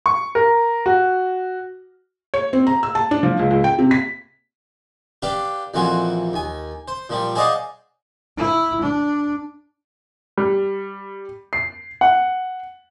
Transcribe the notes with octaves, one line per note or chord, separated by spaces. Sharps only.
C#6
A#4
F#4
C#5
C4
A#5
E6
A5
D4
F3
C#2
C#2
G5
C3
B6
D4 G4 B4 F5 G5
A#1 F2 E3 F4 F#4 G#5
D#2 G#5
C5
A#2 F3 G3
G#4 C5 D5 D#5 F5 F#5
E4
D4
G3
C7
F#5